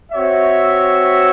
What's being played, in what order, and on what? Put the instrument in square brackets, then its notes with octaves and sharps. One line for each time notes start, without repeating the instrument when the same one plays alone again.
[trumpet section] C4 F#4 C#5 E5